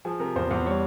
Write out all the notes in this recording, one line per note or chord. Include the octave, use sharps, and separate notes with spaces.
F3 G#4
C3 A#4
E2 C5
E2
G3 C#5